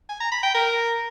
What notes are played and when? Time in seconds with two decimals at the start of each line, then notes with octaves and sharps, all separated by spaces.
0.09 G#5
0.21 A#5
0.32 B5
0.43 G5
0.54 A#4